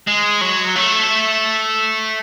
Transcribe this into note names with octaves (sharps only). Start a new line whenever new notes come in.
G#3
F#3
A3